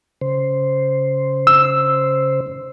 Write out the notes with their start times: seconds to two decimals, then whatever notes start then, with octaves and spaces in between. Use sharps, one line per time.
0.21 C#3 C5
1.47 E6